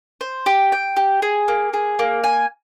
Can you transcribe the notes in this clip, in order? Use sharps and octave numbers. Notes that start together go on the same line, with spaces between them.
C5
G4
G5
G4
G#4
A#3
G#4
A#3
G#5